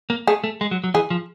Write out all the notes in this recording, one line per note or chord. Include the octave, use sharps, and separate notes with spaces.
A#3
A3 G#4
A3
G#3
F#3
F#3
E3 G#4
F3